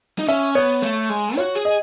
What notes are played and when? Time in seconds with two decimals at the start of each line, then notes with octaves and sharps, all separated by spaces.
0.19 D#4
0.28 C#4 E5
0.55 B3 C#5
0.82 A3
1.10 G#3
1.37 F#4 C#5
1.55 G#4
1.65 D#5